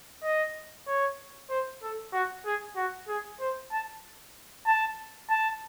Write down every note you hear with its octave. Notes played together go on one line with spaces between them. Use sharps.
D#5
C#5
C5
A4
F#4
G#4
F#4
G#4
C5
A5
A5
A5